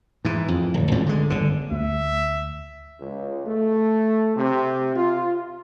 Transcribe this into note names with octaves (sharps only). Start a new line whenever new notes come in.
G#2 E3
F2
D1
G#1 C#2 A2
D3 G#3
G1 D3
D2 E5
C#2
A3
C3
F4